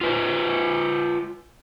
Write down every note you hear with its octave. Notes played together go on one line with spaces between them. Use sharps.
F4 B4 C5